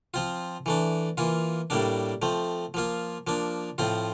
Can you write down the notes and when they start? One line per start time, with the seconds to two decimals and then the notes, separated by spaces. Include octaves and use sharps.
0.14 F3 C4 F4
0.66 E3 A3 D4
1.17 E3 A#3 F4
1.70 A2 G3 A#3 D4
2.22 F3 A3 C4
2.74 F3 A#3 F4
3.27 F3 A#3 D4
3.78 A2 F3 C4 F4